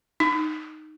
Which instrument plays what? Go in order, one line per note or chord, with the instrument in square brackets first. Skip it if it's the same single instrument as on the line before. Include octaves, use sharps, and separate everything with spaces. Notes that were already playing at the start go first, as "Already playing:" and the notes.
[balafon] D#4